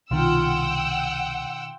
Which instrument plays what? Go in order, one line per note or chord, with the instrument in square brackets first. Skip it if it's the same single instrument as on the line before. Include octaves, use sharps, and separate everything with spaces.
[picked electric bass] C2 [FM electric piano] B2 D#3 [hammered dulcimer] F4 [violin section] F#5 G5 E6